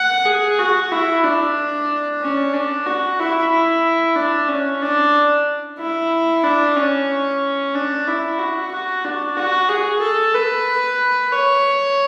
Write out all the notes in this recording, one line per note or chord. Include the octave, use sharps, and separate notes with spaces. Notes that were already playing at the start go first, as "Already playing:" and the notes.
Already playing: F#5
G#4
F#4
E4
D4
C#4
D4
F#4
E4
E4
D4
C#4
D4
E4
D4
C#4
D4
E4
F#4
F#4
D4
F#4
G#4
A4
B4
C#5